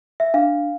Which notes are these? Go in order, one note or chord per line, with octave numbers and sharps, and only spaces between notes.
E5
D4 F5